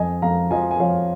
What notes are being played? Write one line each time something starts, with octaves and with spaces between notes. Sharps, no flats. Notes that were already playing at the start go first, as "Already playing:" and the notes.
Already playing: F2 D#5 G#5
F2 F5 A#5
F3 D#5 G#5
G#5
F3 C#5 F5